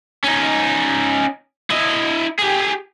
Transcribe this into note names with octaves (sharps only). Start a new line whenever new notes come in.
C#4 D#4
E4 D#5
G4 G#4